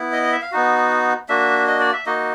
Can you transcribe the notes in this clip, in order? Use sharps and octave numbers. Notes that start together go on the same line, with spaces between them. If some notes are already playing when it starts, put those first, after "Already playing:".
Already playing: B3 E4
D#5
D#5
E5
F5
B3 D#4 F#4
A#3 D4 F#4 E5
D#5
D5
E5
A#3 D#4 F#4 D#5